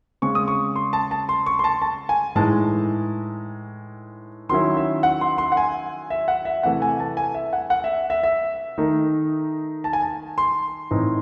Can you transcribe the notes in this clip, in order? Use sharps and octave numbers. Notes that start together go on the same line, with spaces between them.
C#3 G#3 C4 C#6
D#6
C#6
C6
A5
A5
C6
C#6
C6
A5
A5
G#5
A2 E3 G#3 D#4 A5
D#3 F#3 C#4 E4 C6
E5
F#5
C6
C6
F#5
G#5
E5
F#5
E5
C3 E3 A3 F#5
G#5
A5
G#5
E5
F#5
F#5
E5
E5
E5
D#3 A3 D#4
A5
G#5
A5
C6
A2 E3 C4 D#4